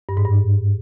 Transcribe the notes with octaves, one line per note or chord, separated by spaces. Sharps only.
G2
G#2
G2